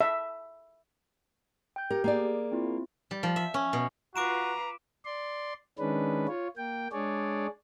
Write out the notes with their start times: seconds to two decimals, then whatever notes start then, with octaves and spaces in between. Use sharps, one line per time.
0.01 E5
1.76 G5 G6
1.90 G4 A#4
2.04 A#3 G#4 D5
2.52 C4 E4 F4
3.11 G3
3.23 F3
3.36 E5
3.54 C#4
3.73 B2
4.16 F4 F#4 B4 A#5 D6 D7 E7
5.05 D5 C6
5.79 D#3 G#3 C#4 D4 B4
6.28 F4 C#5
6.57 A#3 G5
6.92 G#3 D4 G#4 C#5 D5